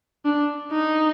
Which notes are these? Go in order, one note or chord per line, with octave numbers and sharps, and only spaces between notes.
D4
D#4